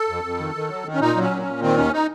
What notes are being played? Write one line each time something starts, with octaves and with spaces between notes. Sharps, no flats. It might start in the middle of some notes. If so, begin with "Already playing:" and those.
Already playing: A4
F2
F2
D#3
D#3
F#3
D#3
C#4
A#2 D#4
F#3
C#4
A#2
A#2 C#4
D#3 C4
D#2 C#4
D#4